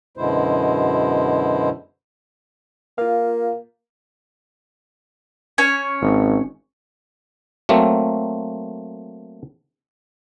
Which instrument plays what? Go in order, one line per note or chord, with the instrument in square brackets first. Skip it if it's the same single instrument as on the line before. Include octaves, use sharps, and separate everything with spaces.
[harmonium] F#2 B2 D3 G#3 E4 C5
[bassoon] A#3 [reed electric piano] F4 F5
[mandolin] C#4 C#5 G#5
[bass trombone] G#1
[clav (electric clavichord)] F#3 A3 A#3 C4